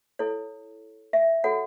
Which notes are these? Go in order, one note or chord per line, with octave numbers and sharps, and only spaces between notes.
E4 A4 C#5
E5
F#4 A4 C#5 F#5